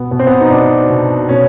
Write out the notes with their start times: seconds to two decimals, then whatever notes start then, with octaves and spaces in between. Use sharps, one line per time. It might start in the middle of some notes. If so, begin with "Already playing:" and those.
Already playing: B2 B3
0.11 B2 B3
0.19 C4
0.27 B3
0.41 D#4
0.50 B2 D4
0.90 B2
1.29 B2 C#4